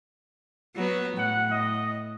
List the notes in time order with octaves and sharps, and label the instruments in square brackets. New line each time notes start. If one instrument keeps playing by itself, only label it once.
[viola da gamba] F#3 B3
[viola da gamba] A2 [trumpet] F#5
[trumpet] D#5